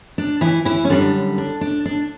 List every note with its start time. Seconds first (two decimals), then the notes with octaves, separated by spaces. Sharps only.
0.18 D4
0.41 E3 E4
0.65 E3 E4
0.85 C#4
0.89 F#2 D3 G3 D4
1.38 D4
1.61 D4
1.86 D4